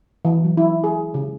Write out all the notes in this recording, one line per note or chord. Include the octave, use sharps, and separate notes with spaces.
E3
F#3
E4
G#4
C#3